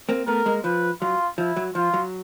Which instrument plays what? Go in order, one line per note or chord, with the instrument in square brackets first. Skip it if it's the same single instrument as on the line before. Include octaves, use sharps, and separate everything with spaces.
[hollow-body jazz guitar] A#3 C4
[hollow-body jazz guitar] A3 B3 [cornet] A#4
[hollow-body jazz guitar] G#3 A#3
[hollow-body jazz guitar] F3 [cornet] B4
[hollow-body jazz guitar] F#3 [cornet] F4
[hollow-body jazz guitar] F3 [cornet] E4
[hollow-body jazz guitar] F#3
[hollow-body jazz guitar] F3 [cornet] F4
[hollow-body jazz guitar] F#3